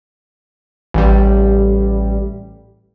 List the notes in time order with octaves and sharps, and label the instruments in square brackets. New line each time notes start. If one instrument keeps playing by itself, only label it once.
[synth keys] A1 G3